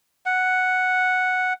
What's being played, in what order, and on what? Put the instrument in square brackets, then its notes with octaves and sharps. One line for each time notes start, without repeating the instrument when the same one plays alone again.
[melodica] F#5